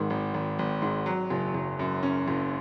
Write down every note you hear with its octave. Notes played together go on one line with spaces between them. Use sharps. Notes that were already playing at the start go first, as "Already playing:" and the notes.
Already playing: G#1 G#2 D#3
G#1
G#1
G#1
G#2
F#3
F#1
F#1
F#2
C#4
F#1